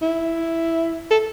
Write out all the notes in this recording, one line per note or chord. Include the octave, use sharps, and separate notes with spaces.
E4
A4